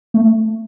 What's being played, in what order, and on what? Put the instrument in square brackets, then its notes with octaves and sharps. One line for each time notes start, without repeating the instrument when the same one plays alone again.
[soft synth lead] A3